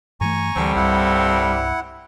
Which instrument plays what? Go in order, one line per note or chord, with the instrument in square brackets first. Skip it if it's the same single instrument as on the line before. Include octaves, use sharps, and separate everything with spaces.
[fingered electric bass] G2 E3 A3 [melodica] G#5 A#5 C#6
[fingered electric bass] D2 E3 [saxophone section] A2 A#3 C4 [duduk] G3
[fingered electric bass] C2 G2 [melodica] E4 F#5